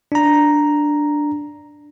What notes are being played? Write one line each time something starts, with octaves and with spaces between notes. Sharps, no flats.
D4 A#5